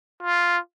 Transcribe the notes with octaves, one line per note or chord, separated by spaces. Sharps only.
F4